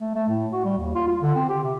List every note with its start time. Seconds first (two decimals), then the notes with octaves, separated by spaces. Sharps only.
0.01 A3
0.15 A3
0.29 A2
0.52 F#4
0.65 G3
0.78 D#2
0.95 F4
1.08 F4
1.21 D3
1.35 C4
1.49 G4
1.63 C3